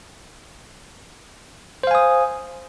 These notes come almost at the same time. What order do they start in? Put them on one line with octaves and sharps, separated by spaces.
C5 F5 G#5 D#6